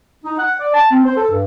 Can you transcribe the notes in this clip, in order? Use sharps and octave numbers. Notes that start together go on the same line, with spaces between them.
D#4
F#5
D5
A5
C4
C5
A4
G2